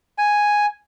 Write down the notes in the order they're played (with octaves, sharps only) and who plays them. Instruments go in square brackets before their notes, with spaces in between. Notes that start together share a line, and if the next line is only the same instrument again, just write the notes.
[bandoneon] G#5